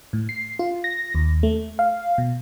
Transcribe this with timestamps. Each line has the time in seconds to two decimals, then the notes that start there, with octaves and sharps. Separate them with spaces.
0.13 A2
0.29 C7
0.59 F4
0.84 A#6
1.15 D#2
1.43 A3
1.79 F5
2.18 B2